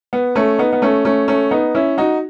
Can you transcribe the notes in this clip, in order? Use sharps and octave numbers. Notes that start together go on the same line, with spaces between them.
B3
A3 C#4
B3 D#4
B3
A3 C#4
A3 C#4
A3 C#4
B3 D#4
C#4 E4
D#4 F#4